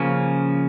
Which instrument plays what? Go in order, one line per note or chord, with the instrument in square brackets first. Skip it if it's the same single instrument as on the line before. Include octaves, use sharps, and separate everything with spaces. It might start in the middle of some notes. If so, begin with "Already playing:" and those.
Already playing: [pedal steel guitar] C#3 F3 A#3 C#4